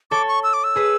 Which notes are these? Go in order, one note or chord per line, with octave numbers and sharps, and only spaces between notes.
A4 C#5 D6
C#6
E6
D6
E6
G#4 B4